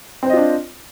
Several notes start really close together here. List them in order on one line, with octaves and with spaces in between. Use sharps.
C4 C5 D#5 F4 D4